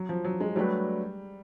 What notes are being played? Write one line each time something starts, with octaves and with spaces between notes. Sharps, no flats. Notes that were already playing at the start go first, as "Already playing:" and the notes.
Already playing: F#3
F3
F#3
G#3
F#3 G3 A3 D4 G4 B4